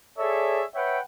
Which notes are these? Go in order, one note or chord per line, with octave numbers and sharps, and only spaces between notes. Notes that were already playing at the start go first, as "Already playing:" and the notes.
G#4 A4 C#5 D5 E5
B4 C#5 E5 F#5 G5